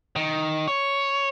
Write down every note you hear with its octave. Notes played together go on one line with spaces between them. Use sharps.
D#3
C#5